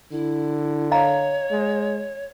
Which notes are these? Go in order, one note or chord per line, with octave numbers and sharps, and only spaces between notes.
D3 E4
C#5 D#5 F5 A#5
G#3